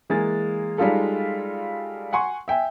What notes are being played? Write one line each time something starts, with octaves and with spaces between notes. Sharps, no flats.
E3 G#3 A#3 G#4 A6
G3 G#3 D#4 F4 A4
F#5 G#5 C6 C#6
E5 G5 G#5